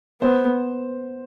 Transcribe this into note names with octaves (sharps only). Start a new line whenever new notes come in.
B3 C5